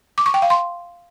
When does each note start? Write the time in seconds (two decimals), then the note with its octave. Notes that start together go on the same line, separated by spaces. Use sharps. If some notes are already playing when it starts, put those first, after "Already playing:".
0.18 D6
0.26 C#6
0.34 G5
0.42 F5
0.50 C6